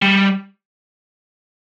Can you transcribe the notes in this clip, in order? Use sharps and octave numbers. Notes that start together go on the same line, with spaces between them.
G3